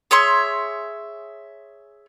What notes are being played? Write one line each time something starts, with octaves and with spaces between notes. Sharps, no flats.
G#4 C#5 E5 C6